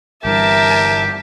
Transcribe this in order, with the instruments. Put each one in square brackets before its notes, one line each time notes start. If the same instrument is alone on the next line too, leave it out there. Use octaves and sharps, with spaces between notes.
[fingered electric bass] G1 G2 E3 [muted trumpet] G4 [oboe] A#4 [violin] E5 A5